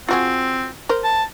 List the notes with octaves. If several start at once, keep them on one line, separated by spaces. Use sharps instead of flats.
C4 F4 F#4 G#4
A#4 C5
A5